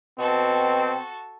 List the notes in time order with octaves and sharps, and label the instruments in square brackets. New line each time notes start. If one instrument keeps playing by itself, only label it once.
[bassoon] B2 [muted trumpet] C4 [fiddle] F#4 A4